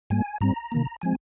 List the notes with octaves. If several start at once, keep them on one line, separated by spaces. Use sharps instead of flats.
G#2 G3 A#3 G#5
G#2 G3 C4 A#5
C3 D#3 A#3
F3 G#3 C4 G#5